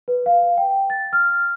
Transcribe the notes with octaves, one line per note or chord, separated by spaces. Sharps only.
B4
F5
G5
A6
F6